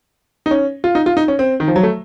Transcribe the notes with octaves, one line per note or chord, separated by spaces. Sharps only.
D#4
C#4
F4
D#4
F4
D#4
C#4
C4
D#3
F3
F#3
A3